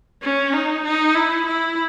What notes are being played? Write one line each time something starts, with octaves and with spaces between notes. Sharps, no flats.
C#4
D#4
D#4
E4
E4